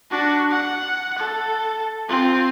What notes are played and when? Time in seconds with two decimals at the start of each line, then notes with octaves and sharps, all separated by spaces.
0.11 D4 F#4
0.51 F#5
1.19 A4
2.09 C4 F4